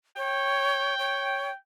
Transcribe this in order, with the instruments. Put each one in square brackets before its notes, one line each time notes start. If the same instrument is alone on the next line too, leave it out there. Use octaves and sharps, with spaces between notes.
[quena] C#5 [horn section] G5
[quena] C#5